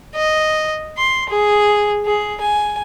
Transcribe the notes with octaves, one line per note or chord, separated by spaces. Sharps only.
D#5
C6
G#4
G#4
G#5